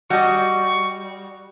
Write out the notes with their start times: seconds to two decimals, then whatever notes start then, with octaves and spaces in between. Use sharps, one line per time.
0.10 G3 F#4 D#5 C#6